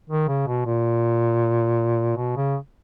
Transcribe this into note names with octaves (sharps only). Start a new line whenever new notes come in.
D#3
C#3
B2
A#2
B2
C#3